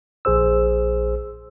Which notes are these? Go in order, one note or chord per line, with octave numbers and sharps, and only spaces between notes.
A#1 G#4 C5 E6